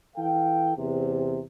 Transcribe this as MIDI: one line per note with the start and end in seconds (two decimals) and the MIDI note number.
0.16 0.71 52
0.16 0.71 69
0.16 0.71 77
0.16 0.71 79
0.77 1.39 40
0.77 1.39 48